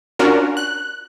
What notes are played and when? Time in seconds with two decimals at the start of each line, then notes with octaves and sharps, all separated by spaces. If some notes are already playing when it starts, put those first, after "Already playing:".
0.19 C#4 D4 F4 F#4 A#4
0.57 F#6